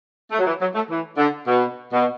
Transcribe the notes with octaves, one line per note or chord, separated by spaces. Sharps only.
A3
F#3
E3
F#3
A3
E3
D3
B2
B2